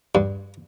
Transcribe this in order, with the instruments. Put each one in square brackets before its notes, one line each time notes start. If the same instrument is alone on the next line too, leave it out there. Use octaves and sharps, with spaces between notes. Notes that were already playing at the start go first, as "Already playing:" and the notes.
[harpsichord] G2